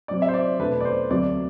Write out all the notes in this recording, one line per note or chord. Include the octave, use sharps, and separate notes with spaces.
C3 F#3 C4 D5
E5
C5
D5
E2 B2 A3 D4 B4
D5
C5
D2 C3 F#3 D5